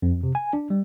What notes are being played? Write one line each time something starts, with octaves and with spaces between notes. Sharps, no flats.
F2
C3
G#5
D4
G3